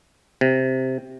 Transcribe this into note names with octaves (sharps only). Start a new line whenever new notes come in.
C3